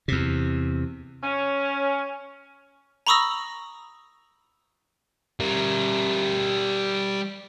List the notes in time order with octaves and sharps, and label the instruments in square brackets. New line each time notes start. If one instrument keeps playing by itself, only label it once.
[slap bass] E2 C3
[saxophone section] C#4
[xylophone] A#5 B5 C#6 D#6 E6 A#6
[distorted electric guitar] G3 A#4